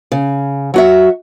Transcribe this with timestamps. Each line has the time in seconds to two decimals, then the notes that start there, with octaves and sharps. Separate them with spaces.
0.12 C#3
0.74 F#3 F#4 E5